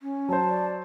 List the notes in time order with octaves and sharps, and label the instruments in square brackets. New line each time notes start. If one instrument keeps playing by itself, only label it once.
[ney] C#4
[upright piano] F#3 C5 [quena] A5
[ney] D5